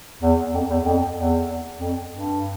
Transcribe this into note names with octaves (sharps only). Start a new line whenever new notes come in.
E2
F2
E2
F2
E2
F2
G2